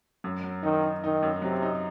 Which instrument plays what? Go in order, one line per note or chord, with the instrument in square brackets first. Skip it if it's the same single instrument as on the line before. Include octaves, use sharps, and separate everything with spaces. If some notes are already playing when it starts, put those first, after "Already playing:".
[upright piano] F#2
F#3
[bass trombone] D#3 [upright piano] D#4
[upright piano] D#4
[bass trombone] D#3 [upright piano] D#4
[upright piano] F#2
[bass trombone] C3 [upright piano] F#3
[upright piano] D#4